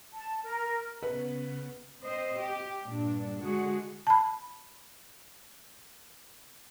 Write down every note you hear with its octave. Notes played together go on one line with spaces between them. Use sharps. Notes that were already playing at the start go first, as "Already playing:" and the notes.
A5
A#4
C#3 B3 B4
C4 C5 D#5
G4
G2 A#2 D4
D3 G#3 F#4 G#4
A5 B5